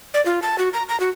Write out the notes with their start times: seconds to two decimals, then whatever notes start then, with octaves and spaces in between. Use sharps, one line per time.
0.14 D5
0.26 F4
0.42 A5
0.58 F#4
0.73 A#5
0.89 A#5
1.00 F#4